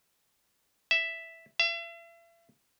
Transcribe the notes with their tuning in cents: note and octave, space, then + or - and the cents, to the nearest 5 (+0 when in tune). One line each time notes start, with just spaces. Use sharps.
E5 +0
E5 +40